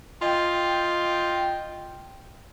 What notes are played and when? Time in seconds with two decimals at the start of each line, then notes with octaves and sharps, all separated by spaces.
0.22 F4 D#5 G5